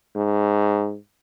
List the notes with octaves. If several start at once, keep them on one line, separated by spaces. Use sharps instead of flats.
G#2